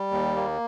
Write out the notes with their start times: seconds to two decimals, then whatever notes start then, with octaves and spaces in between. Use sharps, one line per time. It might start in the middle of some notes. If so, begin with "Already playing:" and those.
Already playing: G3
0.11 D#2
0.36 A#3